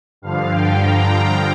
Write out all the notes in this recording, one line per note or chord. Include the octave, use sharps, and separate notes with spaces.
G2 D3 F3 F5
G5
A#5
G5